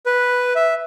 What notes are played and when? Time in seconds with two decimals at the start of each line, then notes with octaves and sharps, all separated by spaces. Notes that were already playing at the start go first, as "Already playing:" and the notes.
0.06 B4
0.55 E5